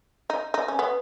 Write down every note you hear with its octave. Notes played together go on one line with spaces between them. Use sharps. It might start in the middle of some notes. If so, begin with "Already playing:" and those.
D#4
D#4
C#4
B3